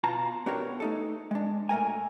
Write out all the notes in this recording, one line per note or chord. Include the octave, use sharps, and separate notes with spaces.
B2 F4 A5 A#5
B3 D4 F#4 G4 A#4 C#5
A3 D#4 A4
G#3 D4
A#2 A3 A#4 G#5